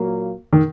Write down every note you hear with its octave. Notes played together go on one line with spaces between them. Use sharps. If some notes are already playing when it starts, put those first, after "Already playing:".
Already playing: A#2 F#3 A#3
D#3